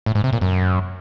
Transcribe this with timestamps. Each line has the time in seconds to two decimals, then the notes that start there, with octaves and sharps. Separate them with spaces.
0.06 A2
0.15 G#2
0.24 C3
0.33 A#2
0.41 F#2